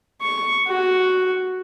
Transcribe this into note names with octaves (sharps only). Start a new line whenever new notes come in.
C#6
F#4